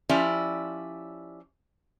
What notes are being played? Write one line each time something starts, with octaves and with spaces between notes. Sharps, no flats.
F3 C#4 E4 G4 D5